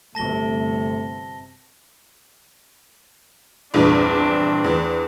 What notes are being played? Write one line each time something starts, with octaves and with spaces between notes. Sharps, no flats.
G1 C3 A3 A5 A#6 G7
A#1 E2 G2 C4 D4
E2